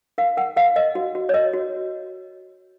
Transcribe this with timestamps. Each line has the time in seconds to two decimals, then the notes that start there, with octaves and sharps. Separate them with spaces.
0.18 A#4 F5
0.37 A#4 F#5
0.56 A#4 F5
0.76 A#4 D#5
0.95 F#4
1.15 F#4
1.29 C#5
1.34 A#4 D#5
1.53 F#4